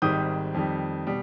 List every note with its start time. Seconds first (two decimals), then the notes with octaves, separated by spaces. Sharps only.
0.02 G#1 G#2 D#3 G3 D#6 G6
0.54 F2 D#3 G3
1.07 B2 G3